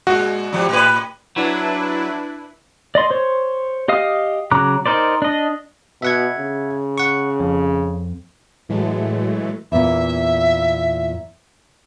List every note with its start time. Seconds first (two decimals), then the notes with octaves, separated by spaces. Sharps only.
0.07 A#2 G#3 F#4
0.53 G#2 F3 G3
0.69 A2 B4
1.36 F#3 D4 E4 B4
2.95 D5 D#5 C6
3.11 C5 C#5
3.88 G4 D#5 F5 D#6
4.51 C#3 F#3 A#5 D6 F#6
4.86 D#4 A#4 C5 D5
5.22 D4 D#5
6.02 B2 E5 F#5 G#6
6.38 C#3
6.98 F#5 C#6
7.40 F2
8.69 A2 E3 F#3 G#3 A3
9.72 E2 A#2 E5